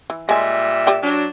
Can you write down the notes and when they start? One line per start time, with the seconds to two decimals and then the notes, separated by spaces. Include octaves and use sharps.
0.10 E3
0.29 A#2 G3 G#3 E5 G#5
0.87 G4 D5 G5
1.02 F#3 D4